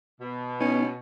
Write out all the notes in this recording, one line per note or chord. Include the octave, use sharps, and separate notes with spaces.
B2
B3 C#4 D#4